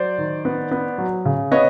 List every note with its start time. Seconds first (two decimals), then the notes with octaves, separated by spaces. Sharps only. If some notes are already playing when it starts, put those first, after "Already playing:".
Already playing: F#3 C5 D5
0.18 D#3
0.45 B3
0.71 B3
0.98 F#3
1.25 C#3
1.51 B3 C#5 D#5